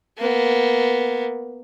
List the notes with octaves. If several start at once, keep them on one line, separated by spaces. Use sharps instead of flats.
A#3 B3